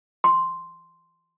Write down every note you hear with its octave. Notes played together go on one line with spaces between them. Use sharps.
C6